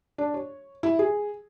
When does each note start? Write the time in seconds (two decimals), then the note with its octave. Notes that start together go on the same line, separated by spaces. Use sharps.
0.18 D4
0.34 C#5
0.83 E4
0.99 G#4